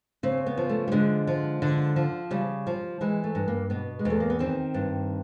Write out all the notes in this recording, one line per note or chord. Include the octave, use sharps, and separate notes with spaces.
C#3 C4
B3
F3
A3
G3
D3 G#3
F3
D3
F3
C#3 G3
F3
E3 G#3
A3
G2
A#3
B2 B3
G#3
E2 A3
A#3
B3
D#3 C4
G2